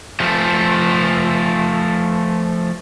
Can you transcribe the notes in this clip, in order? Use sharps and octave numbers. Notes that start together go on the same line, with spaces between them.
F3 A3